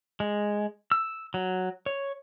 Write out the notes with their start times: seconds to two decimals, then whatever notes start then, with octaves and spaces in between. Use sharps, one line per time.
0.20 G#3
0.92 E6
1.34 F#3
1.86 C#5